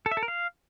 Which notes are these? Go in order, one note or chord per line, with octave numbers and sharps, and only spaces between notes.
A4
E5
A4
A#4
F5